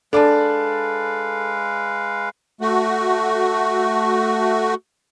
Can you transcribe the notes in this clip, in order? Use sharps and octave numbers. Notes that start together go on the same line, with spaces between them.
G#3 D4 A4 B4 D5 F5 A5
A3 F#4